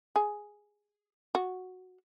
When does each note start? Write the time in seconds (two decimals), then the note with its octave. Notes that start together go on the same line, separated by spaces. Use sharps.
0.16 G#4
1.35 F#4